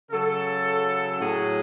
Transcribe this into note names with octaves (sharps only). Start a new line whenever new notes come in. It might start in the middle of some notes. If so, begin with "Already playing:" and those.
C#3 F#3 A4
A2 F#3 G#4